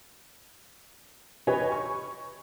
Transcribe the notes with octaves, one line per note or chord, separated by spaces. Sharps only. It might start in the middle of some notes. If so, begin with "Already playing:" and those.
G4 B4 C#5 D#5 G#5
C#6